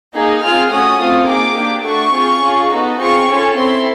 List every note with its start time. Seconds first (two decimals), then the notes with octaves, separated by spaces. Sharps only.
0.12 A#3 D#4 G#4
0.41 C4 F4 G#4 F6
0.70 A3 C#4 F#4 D#6
0.99 A3 C4 F4 A4
1.27 A#3 D#4 G#4 D6
1.56 A#3 D4 G4
1.84 A3 D4 F#4 C#6
2.13 C4 F4 G#4
2.42 C#4 F4 G#4
2.71 B3 D#4 F#4 A4
3.00 C4 F4 G#4 C#6
3.28 C#4 F4 A4
3.57 C4 E4 A4 C6